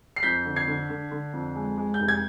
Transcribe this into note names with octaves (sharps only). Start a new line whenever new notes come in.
C7
F2 G6 B6
D3
G#6 C7
D3
D3
D3
F2
G#3
G#3
G6
F1
G#6